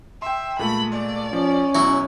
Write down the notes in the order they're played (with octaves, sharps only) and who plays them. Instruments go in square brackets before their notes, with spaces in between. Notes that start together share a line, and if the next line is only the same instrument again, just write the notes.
[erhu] E5 [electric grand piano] G5 C6
[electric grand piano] A#2 G#3 A3 [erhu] B5
[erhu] D5
[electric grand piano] F3 [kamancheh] C#4
[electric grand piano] B1 [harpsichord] F#3 E4 F#4